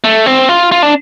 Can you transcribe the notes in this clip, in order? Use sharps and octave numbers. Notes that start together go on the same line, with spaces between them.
A3
C4
F4
F4
D4